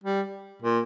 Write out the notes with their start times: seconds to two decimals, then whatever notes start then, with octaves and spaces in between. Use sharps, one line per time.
0.04 G3
0.62 A#2